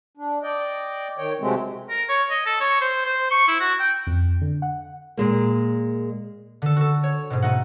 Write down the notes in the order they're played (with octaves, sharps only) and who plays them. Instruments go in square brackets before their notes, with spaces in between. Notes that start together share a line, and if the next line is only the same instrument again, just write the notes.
[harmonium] D4
D5 D#5 G5
D#3 C#5 G5
C3 F#3 G#3 A3 C4
[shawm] A#4
C#5
D#5
A4
C#5
C5
C5
C#6
E4
F#4
G5
[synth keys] F2
D3
F#5
[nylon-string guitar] A#2 G#3 A#3
[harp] D3 A4
F#4 A4
C#5
G#2 B2
A3 D#4 F#5